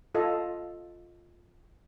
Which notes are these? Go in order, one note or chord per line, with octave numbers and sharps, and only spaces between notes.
F4 A4 D#5 F5